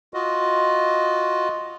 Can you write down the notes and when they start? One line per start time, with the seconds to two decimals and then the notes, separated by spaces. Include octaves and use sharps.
0.14 F4 F#4 D#5